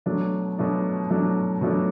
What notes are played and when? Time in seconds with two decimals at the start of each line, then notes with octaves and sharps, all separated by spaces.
0.06 B2 F#3 A3 D4
0.58 B2 F#3 A3 D4
1.10 B2 F#3 A3 D4
1.61 B2 F#3 A3 D4